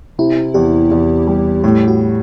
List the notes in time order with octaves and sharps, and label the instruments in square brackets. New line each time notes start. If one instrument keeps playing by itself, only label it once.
[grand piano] C3 [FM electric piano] E4
[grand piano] E2 [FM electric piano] G4
[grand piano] E2
G3
[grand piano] A2 [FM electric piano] G4
[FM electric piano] F#4